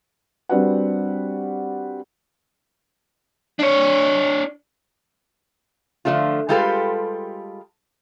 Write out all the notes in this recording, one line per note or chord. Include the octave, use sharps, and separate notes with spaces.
G3 C4 D4 F#4 B4 F#5
D4 C#5
D3 F3 A3 D4 F4
G3 G#3 F4 G4 A4 B4